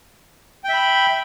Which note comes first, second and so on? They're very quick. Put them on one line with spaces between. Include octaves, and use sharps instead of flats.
G5 E5 B5